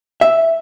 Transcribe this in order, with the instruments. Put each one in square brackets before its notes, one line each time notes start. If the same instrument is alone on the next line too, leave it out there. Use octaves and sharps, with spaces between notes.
[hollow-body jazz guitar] E5